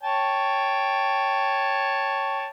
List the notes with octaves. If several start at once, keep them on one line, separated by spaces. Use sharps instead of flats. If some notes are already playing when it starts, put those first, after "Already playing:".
C#5 G5 A5